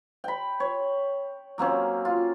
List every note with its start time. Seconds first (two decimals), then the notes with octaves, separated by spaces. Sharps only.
0.24 G5 B5
0.60 C#5
1.58 F#3 A#3 C4 C#4
2.05 F4